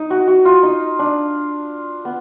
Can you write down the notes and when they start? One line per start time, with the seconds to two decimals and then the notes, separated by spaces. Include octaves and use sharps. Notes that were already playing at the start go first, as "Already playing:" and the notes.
Already playing: D#4
0.10 F#4
0.28 F#4
0.45 F4
0.63 D#4
0.99 D4
2.05 B3